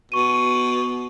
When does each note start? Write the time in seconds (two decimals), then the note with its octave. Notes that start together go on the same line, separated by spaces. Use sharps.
0.12 B2 C#6 D#7